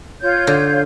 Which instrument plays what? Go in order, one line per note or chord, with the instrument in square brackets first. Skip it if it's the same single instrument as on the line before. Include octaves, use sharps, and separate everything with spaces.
[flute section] F4 C#5 G6
[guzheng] D3